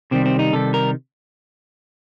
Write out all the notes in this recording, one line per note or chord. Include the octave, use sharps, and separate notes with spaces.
C3 D#3 G3 C4
C4
D#4
C3 D#3 G3 A4
A#4